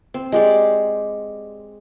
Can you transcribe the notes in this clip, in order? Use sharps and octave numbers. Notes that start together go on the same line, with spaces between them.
C4
G#3 G4 D5